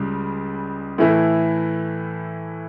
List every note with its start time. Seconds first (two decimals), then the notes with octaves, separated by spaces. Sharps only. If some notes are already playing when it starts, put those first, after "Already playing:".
Already playing: C#2 C#3 G3
0.98 A2 E3 A3 E4